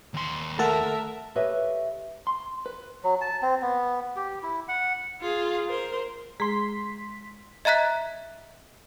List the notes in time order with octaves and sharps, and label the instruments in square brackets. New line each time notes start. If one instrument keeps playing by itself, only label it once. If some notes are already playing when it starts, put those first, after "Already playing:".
[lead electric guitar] D#2 C6
[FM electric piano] A3 A4 F#5 [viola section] A#4 E5 [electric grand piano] A5
[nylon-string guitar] G4 A4 B4 C#5 D#5 E5
[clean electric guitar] C6
B4
[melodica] F#3
A5
C4
B3
G4
E4
F#5
[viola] F4 G#4
A#4 C5
[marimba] G#3 G#4 A#5 [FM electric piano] C6 B6
[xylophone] D#5 E5 A#5 F#6 B6